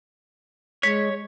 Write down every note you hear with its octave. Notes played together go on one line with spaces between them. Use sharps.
G#3 C#5 B6